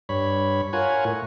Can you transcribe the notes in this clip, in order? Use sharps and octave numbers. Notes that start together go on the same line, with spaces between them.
G2 C#5 B5
F4 A#4 C#5 F#5 G#5
A2